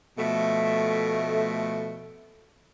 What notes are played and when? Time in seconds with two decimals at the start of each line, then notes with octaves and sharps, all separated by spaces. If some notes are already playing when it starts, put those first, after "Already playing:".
0.18 B2 F3 A3